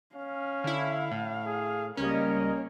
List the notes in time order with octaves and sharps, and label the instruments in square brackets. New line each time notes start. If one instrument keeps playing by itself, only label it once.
[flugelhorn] C#4 [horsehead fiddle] F5
[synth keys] D3 E4
A2
[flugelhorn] G#4
[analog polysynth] C#2 G3 D#5 [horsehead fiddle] A#3 C#5 [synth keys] C#4 [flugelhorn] A#4